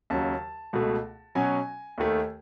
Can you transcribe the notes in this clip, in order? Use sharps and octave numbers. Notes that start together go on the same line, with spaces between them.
D#2 C#3 F#3 A5
C#2 B2 A3
B2 F#3 C#4 G#5
D#2 D#3 A3